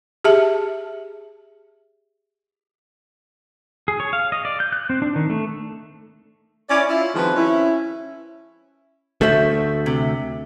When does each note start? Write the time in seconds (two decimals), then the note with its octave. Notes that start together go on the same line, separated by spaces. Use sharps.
0.24 G4 G#4 E5 A5
3.88 G#4
4.00 C#5
4.13 F5
4.32 D#5
4.45 D5
4.60 G6
4.72 F#6
4.90 C4
5.02 D4
5.16 D#3
5.30 A3
6.69 C#4 E4 D5
6.89 E4 F4
7.15 D#3 F3 G#3 C4 F#4 B4
7.36 C#4 E4
9.21 D2 A3 F#4 C5 E5
9.86 C3